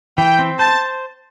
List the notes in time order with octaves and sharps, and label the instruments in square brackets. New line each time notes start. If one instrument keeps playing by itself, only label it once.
[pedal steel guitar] E3 [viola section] G5
[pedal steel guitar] C4
[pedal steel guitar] C5 [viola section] A5